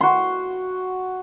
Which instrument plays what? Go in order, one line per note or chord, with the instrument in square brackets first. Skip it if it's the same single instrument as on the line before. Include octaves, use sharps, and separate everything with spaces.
[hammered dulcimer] F#4 C6